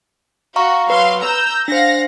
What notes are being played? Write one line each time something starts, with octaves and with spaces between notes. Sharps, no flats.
F#4 F5 A#5 C#6
F#3 B4 F5 C6
A#5 E6 G6
D4 C5 F5 F#5 A#6